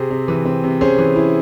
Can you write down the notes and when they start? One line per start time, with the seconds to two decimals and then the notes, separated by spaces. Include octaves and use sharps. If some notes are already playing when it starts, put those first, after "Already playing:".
Already playing: C3 C4 G#4
0.10 C3
0.28 E3
0.45 C4
0.64 C3
0.81 C#4 G#4 C5
0.98 E3
1.16 E4